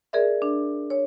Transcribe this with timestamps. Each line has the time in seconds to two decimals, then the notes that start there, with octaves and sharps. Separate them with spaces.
0.13 G#4 A#4 D5 E5
0.42 D4
0.90 C#5